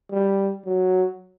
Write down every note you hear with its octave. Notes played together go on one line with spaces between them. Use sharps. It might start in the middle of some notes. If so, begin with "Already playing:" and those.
G3
F#3